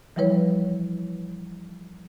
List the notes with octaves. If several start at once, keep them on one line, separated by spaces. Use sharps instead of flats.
E3 F3 G3 E4 B4 C#5